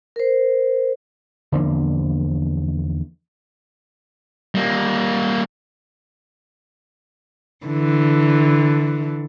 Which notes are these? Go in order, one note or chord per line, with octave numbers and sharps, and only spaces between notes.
A#4 C5
E2 D3 F3 A#3
G3 A#3
D3 E3